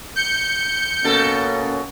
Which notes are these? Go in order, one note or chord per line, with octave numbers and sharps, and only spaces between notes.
G6 C#7
B2 A#3 C#4 A4